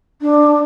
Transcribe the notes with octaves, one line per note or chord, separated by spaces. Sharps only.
D4